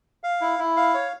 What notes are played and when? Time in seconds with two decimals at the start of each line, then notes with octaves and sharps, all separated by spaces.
0.24 F5
0.41 E4
0.59 E4
0.77 F5
0.94 C#5